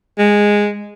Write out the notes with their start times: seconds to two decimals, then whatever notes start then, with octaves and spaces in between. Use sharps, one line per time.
0.18 G#3